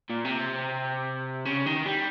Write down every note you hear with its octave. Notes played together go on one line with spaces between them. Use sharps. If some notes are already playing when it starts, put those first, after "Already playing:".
A#2
C3
C#3
D#3
G3